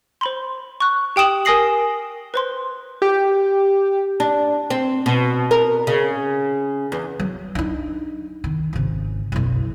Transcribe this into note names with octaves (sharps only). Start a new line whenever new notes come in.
C5 B5 C6
C#6 F#6
G4 G5 D#6 E7 F#7
A#4 G#5 D#6 A#6 C7 F#7
B4 C5 C6
G4
D4
C4
B2
A#4
C#3
E2
F#3
D4 D#4
D#3
G#1 C#3
F#1 B1